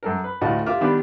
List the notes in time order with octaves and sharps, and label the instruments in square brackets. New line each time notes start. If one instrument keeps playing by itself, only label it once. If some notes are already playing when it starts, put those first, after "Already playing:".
[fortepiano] F#2 A4 A#4
B4
D2 A2 F4 F#4 D#5
F4 G4 A#4 E5 D6 F6
D#3 G3 B3 D4